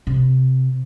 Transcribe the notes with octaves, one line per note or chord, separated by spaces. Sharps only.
C3